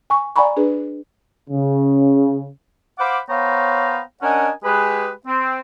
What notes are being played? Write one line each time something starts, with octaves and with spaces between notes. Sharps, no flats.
G#5 C#6
D5 F#5 G#5 A#5 B5 C#6
D4 G#4 B4
C#3
C5 F5 F#5 B5 D6
B3 C5 C#5 F5 G5 A#5
C#4 D4 A#4 D#5 F#5 G#5
G#3 G4 G#4 B4
C4